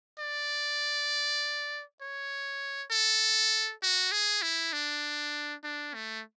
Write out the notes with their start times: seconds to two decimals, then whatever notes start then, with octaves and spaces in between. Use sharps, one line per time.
0.19 D5
2.01 C#5
2.91 A4
3.83 F#4
4.12 G#4
4.42 E4
4.73 D4
5.64 D4
5.94 A3